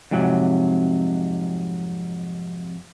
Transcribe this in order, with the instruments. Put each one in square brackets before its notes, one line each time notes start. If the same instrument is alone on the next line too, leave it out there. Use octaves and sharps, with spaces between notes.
[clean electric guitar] F2 G#2 C3 F#3